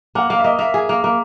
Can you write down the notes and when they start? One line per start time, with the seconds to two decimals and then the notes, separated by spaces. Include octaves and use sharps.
0.15 A#3 F#5
0.30 A#3 F5
0.39 E5
0.44 A#3 D#5
0.59 A#3 E5
0.74 G#4
0.89 A#3
1.04 A#3